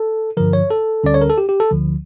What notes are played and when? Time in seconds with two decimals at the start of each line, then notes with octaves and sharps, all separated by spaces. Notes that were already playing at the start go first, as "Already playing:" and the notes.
Already playing: A4
0.37 G2 D3 F3 A#4
0.53 C#5
0.70 A4
1.04 D2 D3 G3 C#4 D5
1.14 C#5
1.22 A#4
1.30 A4
1.38 G4
1.49 G4
1.60 A4
1.71 D2 D3 F3